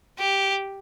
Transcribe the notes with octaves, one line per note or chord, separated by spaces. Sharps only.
G4